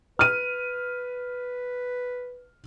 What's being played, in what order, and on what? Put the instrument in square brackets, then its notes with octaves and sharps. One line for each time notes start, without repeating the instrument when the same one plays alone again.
[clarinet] B4 [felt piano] F6 D#7